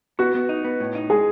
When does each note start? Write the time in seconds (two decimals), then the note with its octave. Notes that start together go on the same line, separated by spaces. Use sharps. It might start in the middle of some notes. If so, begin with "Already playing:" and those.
0.19 B3 F#4
0.35 B3
0.49 D#4
0.64 B3
0.80 A2
0.95 D#4
1.10 G#3 G#4